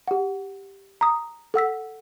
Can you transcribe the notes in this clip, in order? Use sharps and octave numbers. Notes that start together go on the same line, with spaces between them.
G4 F#5
A#5 D#6
A4 F#5 E6 B6